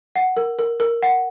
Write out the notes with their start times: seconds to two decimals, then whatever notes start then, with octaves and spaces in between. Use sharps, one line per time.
0.16 F#5
0.37 A#4
0.59 A#4
0.80 A#4
1.03 F#5